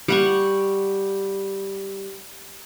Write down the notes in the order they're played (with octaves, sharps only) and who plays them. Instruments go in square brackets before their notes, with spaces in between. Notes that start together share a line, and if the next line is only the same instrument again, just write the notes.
[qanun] G3 F#5 C#6